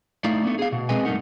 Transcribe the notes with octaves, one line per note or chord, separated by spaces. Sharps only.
A3 D#4 E4 D5 F5
A3 B3 D4
G#4 F5
B2
G#3 C4 G#4 B4 D#5 G#5
G2 A#2 A3 D#4 A#4 F#5